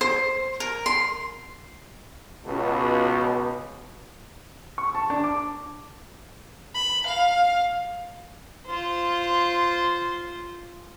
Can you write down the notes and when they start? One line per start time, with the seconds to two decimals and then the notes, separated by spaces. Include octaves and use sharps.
0.01 C5
0.60 A#4
0.86 C6
2.45 C#2 B2
4.78 C#6
4.95 A5
5.10 D4
5.24 D6
6.74 B5
7.06 F5
8.66 F4 C5